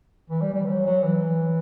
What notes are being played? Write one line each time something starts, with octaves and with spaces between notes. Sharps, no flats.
E3
G3
G3
E3
F#3
F#3
E3